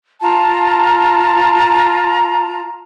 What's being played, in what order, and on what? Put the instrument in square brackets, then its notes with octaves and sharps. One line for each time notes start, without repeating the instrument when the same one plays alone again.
[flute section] F4 A5 A#5